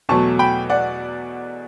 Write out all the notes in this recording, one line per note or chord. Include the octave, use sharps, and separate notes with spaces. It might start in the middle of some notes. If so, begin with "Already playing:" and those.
E2 B2 F#3 A3 A5 C#6
G5 B5
D5 F#5